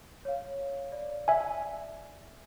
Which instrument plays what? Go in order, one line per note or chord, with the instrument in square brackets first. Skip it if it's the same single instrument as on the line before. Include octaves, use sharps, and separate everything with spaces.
[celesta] C#5 F5
D5
[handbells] E5 G#5